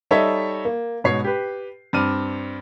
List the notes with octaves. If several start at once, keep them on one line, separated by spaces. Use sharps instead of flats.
G3 D#4 A4 C#5 D#5 E5
A#3
G#2 B2 C#5 C7
G4 B4
G2 C4 D5 F6 D#7